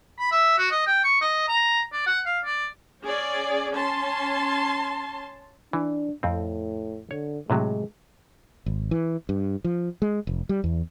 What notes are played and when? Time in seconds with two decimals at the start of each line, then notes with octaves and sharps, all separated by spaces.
0.19 B5
0.32 E5
0.58 F#4
0.71 D#5
0.87 G5
1.04 C#6
1.21 D#5
1.48 A#5
1.93 D5
2.07 F#5
2.26 F5
2.45 D5
3.03 C#4 G#4 D5
3.72 C#4 A5 C6
5.73 E3 D4
6.23 F2 A2 C4
7.11 D3 C#5
7.50 A2 C3 F#3 G#3
8.66 G#1
8.91 E3
9.29 G2
9.64 F3
10.02 G#3
10.27 F1
10.49 G3
10.64 E2